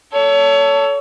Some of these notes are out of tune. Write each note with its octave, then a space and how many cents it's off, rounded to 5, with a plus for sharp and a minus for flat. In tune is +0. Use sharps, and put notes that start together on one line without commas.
A4 +10 C#5 +30